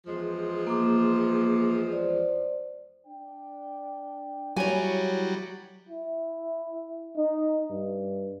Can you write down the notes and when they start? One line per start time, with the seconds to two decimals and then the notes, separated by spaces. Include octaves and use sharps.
0.07 E2 F3 G#3
0.67 A#3 D6
1.92 C5 D5
3.07 D4 G5
4.56 F#3 G3 E4 C#5 G#5
5.89 E4
7.17 D#4
7.70 G2